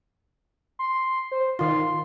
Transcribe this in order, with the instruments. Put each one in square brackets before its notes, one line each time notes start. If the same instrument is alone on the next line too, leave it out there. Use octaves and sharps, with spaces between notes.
[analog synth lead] C6
C5
[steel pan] D#3 F4 [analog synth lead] C6